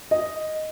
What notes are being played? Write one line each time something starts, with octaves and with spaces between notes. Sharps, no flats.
D#5